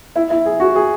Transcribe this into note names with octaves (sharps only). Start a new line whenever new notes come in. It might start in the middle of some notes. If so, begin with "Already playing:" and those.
E4
E4
G#4
F#4
G#4